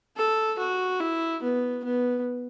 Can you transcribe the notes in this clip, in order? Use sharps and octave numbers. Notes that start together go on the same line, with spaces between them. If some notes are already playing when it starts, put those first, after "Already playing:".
A4
F#4
E4
B3
B3